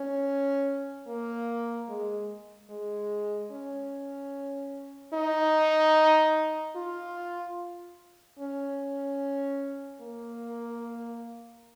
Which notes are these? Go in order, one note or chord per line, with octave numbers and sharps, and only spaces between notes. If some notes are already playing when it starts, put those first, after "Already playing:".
Already playing: C#4
A#3
G#3
G#3
C#4
D#4
F4
C#4
A#3